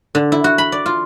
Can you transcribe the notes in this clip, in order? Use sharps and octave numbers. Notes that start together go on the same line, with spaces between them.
D3
E4
F#4
B5
D5
F4